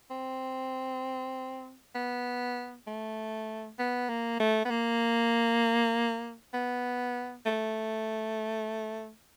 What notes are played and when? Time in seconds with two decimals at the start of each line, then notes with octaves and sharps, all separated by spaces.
0.11 C4
1.95 B3
2.87 A3
3.79 B3
4.09 A#3
4.40 A3
4.65 B3
4.70 A#3
6.54 B3
7.46 A3